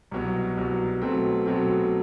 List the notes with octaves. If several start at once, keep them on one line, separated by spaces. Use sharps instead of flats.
C2 B2 F#3
C2 B2 F#3
B2 F#3 A3 C4
B2 F#3 A3 C4